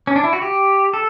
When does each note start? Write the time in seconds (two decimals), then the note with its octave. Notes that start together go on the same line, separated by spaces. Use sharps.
0.07 C#4
0.16 D4
0.24 E4
0.33 F#4
0.42 G4
0.94 A4